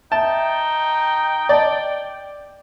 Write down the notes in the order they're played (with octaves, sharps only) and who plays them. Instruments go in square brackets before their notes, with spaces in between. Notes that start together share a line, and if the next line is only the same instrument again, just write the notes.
[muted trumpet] D#4 [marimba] E5 [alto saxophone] G5 [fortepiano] A5
[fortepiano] D5 [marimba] D#5 A5